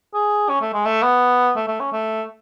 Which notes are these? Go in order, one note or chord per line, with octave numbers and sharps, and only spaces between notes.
G#4
C#4
A3
G#3
A3
B3
A3
A3
C#4
A3